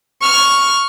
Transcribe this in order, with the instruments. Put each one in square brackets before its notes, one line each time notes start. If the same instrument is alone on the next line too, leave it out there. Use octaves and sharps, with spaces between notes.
[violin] C#6 F6